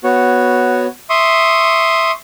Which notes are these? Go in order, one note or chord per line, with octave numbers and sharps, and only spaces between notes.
B3 F#4 C#5
E5 C6 C#6 D#6